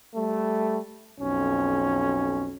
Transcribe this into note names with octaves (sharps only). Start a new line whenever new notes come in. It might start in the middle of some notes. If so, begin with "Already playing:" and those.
G3 A3
B1 F2 C#4